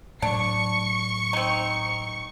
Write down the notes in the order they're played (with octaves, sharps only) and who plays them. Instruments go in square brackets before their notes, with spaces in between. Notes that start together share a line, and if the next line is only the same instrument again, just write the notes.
[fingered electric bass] A2 F#3 [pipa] D4 [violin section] C#6 C#7
[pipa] C4 D#4